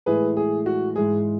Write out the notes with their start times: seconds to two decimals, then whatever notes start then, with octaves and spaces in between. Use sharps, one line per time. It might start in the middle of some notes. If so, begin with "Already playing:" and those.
0.06 A2 E3 G#3 G#4 B4
0.37 G#4
0.66 F#4
0.96 G#2 E3 G#3 G#4